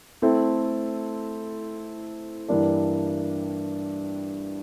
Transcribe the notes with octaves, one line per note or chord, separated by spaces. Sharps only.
A3 C4 E4 A4
G2 E3 G3 A#3 D4